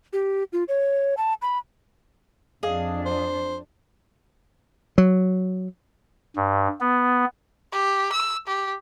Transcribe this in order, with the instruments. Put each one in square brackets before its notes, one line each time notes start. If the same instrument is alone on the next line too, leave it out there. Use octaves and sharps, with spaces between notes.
[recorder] G4
F4
C#5
A5
B5
[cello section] F2 D4 [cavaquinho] G#4 D#5 F5
[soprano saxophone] C5
[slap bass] F#3
[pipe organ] G2
B3
[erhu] G4
E6
G4